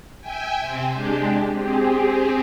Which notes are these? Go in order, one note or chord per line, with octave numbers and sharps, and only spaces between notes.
E5 G5 G#5
C3 C4
G#3 D4 G4
C4 G4 G#4